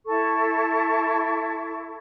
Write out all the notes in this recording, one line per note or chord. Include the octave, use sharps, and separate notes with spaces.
E4 A4 C#6